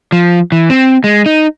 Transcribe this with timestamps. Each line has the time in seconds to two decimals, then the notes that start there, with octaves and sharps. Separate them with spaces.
0.12 F3
0.52 E3
0.70 C4
1.04 G#3
1.26 D#4